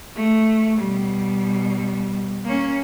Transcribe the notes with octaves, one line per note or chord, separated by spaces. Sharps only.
A3
B2 G3
A#3 C#4